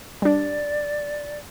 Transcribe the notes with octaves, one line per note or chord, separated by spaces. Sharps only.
G3 D4 D5